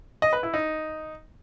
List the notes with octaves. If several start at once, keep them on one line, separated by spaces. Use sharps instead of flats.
D#5
B4
E4
D#4